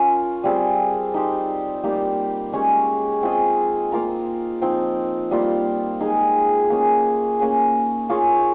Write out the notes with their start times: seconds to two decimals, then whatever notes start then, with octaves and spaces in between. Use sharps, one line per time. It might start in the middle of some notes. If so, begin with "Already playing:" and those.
Already playing: C#4 F4 A#4
0.44 G3 C4 F4 G#4
1.14 D#4 G4 C5
1.83 G3 A#3 D#4 G4
2.53 G#3 C#4 G4 C#5
3.23 C4 F4 G#4 D#5
3.92 A#3 F4 A#4
4.62 F3 C4 D#4
5.31 G3 A#3 F4
6.01 G#3 D#4 G#4
6.70 A#3 C#4 G#4
7.39 A#3 C#4 G#4
8.09 A#3 F4 G#4 C#5